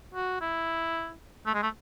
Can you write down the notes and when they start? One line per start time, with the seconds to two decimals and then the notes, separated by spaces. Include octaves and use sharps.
0.15 F#4
0.41 E4
1.46 A3
1.54 G#3
1.63 A3